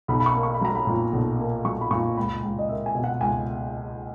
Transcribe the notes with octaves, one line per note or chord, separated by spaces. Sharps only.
B1 B5
B5
C#6
A#3
C#6
B5
F#3 A#5
B5
A#2
B1
A#3
F#3 C#6
B5
A#2 C#6
C#2 B5
C#2
D#5
A#3 E5
G#5
B2
F#5
C#2 G#5